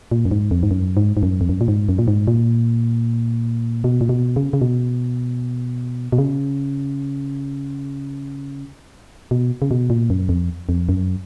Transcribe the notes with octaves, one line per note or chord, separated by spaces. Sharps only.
A#2
F#2
G#2
F2
G#2
F#2
G#2
G#2
F#2
F2
F#2
A#2
G#2
F#2
A#2
G#2
A#2
B2
A#2
B2
C#3
C#3
B2
B2
C#3
B2
C#3
B2
A#2
F#2
F2
F2
F#2